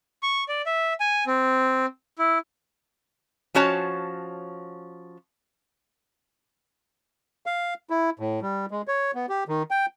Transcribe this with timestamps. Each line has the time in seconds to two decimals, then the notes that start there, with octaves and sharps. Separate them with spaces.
0.23 C#6
0.48 D5
0.66 E5
1.00 G#5
1.27 C4
2.18 E4
3.55 F3 C#4 F#4 C#5 A5
7.46 F5
7.90 E4
8.19 A2
8.42 G3
8.71 G#3
8.88 C#5
9.15 B3
9.29 G4
9.48 D#3
9.71 G5